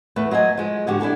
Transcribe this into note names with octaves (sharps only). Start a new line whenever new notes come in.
E2 A3 B4
F#3 C5 D#5 G#5
F3 G#3
G#2 D3 F3 F#4 G4
D4 E4 A4 G#5